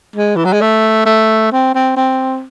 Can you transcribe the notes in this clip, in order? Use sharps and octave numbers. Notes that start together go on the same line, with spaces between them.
G#3
E3
F#3
G#3
A3
A3
C4
C4
C4